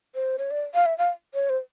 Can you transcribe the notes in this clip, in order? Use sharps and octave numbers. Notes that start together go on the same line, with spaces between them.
C5
C#5
D5
F5
E5
F5
C#5
C5